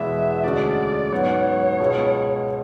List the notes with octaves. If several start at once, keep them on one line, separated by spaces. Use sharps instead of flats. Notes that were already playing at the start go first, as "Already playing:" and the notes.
Already playing: E2 B2 G#3 B3 E4 E5
D2 D3 G#3 C#4 F#4 D5
G#2 F#3 B3 C#5
C#2 B2 G#3